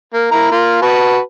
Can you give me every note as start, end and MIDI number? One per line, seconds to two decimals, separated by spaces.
0.14 0.29 58
0.32 0.49 58
0.32 0.49 64
0.32 0.49 82
0.51 0.77 58
0.51 0.77 65
0.82 1.18 66
0.82 1.18 71
0.82 1.18 81